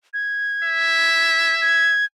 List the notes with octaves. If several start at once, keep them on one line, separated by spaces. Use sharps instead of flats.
G#6
E5
G#6